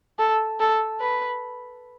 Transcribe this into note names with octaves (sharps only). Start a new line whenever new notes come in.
A4
A4
B4